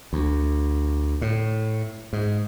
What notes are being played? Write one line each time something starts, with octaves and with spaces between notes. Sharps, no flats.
D2
A2
G#2